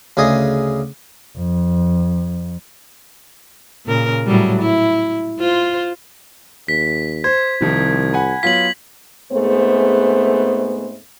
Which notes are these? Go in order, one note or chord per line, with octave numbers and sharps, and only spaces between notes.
D2 C#3 G#4 D#5
F2
A#2 C#3 A#4
A2 F#3 G3
E4
F4 C5
D#2 B6
C5 G#6
C2 C3 D#3 F3
F#5 G#5 B5
F#3 B3 F4 B6 F#7
G#2 A3 B3 C4 G#4 C5